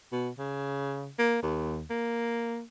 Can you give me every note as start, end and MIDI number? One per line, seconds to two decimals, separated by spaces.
0.12 0.29 47
0.39 1.11 49
1.19 1.42 58
1.43 1.85 39
1.90 2.63 58